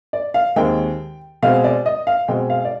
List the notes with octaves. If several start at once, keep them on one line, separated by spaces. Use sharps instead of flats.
D5
F5
D#2 D#3 G#3 C4 G5
B2 G#3 C4 F5
D5
D#5
F5
B2 G#3 C4 G5
F5
D5